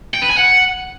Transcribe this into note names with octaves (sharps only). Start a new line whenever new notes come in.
G5
B4
G#5
F#5